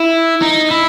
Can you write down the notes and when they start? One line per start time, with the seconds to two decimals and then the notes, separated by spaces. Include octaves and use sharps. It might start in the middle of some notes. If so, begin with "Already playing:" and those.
Already playing: E4
0.42 D#4
0.70 E4